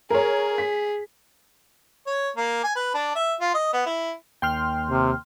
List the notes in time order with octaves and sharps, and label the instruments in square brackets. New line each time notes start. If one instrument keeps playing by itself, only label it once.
[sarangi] G#4 [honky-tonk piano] A#4 C#5
[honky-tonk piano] B6
[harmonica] C#5
A#3
G#5
B4
D4
E5
F4
D#5
B3
E4
[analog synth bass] D#2 [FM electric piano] G5 C6 F6
[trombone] C3